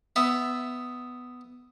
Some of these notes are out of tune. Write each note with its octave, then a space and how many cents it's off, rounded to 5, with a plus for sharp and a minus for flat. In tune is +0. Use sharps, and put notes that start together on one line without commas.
B3 +10 E5 +0